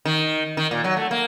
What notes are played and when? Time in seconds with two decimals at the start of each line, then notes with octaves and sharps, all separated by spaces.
0.05 D#3
0.57 D#3
0.71 A#2
0.84 F#3
0.97 A3
1.11 A#3